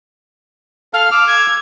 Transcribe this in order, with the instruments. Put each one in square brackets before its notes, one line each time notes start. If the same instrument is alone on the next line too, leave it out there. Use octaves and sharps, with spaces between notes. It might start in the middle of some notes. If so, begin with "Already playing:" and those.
[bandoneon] A4 F5 [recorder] F6
[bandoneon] D6 E6
[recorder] G#6